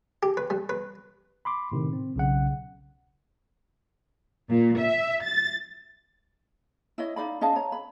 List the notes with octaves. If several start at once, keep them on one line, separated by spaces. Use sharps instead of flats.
G4
B4
G3
B4
B5 C6 D6
A2 C3 D#3
C4
B1 C#3 F#5
A#2
E5
A6
E4 C#5 D#5
D#4 D5 F5 B5
C#4 D#5 F5 A5
C#5 A#5
B5